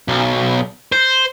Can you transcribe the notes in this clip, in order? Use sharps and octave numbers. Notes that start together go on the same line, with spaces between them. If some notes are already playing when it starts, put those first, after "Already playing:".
B1
C5